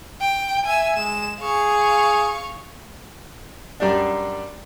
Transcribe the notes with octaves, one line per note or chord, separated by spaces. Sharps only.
G5
E5 G#5 E6
G#3 E7
G#4 F5 C#6
F#2 G3 D4